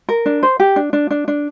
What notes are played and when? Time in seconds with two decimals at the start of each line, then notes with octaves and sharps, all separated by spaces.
0.09 A#4
0.26 D4
0.43 C5
0.60 G4
0.76 D4
0.93 D4
1.11 D4
1.28 D4